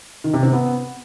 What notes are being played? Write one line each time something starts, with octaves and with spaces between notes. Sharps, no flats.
D#3
C3
C4
B3